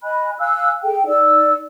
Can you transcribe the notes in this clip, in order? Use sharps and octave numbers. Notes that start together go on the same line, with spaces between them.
D#5 G#5 B5 F#6
F5 G#5 E6 F#6
G#4 A4 G5
D#4 D5 E6